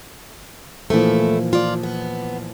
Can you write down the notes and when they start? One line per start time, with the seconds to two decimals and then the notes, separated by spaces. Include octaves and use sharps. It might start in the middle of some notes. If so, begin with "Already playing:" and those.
0.90 A#2 E3 F3 A3 E4
1.53 F4 D5
1.83 B3